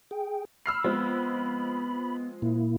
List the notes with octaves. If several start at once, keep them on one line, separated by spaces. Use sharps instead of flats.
G#4 G5
B5 E6 F6 C7
F3 G#3 B3 C4
A#2 A#3 E4